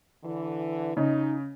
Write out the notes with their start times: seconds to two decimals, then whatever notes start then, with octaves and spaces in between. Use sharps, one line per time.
0.24 D3 E3
0.97 C#3 D#4